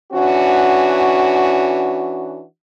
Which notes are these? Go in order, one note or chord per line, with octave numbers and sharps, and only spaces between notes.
E3 C#4 D4 F#4